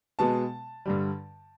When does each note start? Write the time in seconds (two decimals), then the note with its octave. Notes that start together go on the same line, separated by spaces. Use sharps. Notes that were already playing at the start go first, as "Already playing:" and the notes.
0.19 B2 G#3 B3 A5
0.86 G2 D3 G3